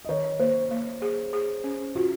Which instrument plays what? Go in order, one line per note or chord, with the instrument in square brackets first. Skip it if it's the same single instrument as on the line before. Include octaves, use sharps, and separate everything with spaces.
[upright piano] D#5
[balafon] D#3 [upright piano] C#5
[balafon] A#3 [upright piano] C5
[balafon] A#3
G#4
G#4
C#4
[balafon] F4 [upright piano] F#4